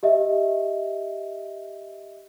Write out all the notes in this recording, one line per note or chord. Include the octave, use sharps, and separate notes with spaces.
G4 D#5 E5